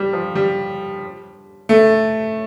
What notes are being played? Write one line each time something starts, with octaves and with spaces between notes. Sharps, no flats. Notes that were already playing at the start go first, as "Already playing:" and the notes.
Already playing: G3
F3
G3
A3